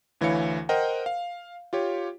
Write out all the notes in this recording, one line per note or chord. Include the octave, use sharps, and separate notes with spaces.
D2 E3 E4 C#5 F5 C#7
A#4 C5 D#5 F#5 G5
F5
F4 G4 C#5